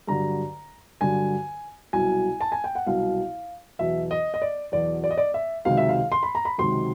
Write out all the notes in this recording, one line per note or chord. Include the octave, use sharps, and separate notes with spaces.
G2 D3 F#3 A#5
G2 D3 F#3 G#5
C2 B2 F#3 G#5
A5
G#5
G5
F#5
C2 B2 F#3 F5
E2 B2 F#3 E5
D#5
D#5
D5
E2 B2 F#3 D5
D5
D#5
D5
E5
C#2 C3 D#3 F#3 F5
E5
F5
C6
B5
A#5
B5
C#2 C3 D#3 F#3 C6